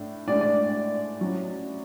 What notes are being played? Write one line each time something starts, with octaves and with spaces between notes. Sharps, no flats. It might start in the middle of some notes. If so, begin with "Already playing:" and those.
Already playing: A2 D4
A2 G#3 D4 D5
D5
F#3 C#4 E4